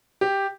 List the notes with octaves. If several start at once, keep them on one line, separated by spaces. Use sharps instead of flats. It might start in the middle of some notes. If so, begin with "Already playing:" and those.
G4